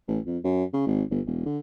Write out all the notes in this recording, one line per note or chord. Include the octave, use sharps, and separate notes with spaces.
A1
F2
F#2
C#3
G#1
G1
E1
D3